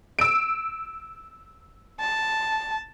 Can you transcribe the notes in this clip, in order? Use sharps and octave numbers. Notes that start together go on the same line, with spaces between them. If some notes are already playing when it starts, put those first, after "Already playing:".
E6 D7
A5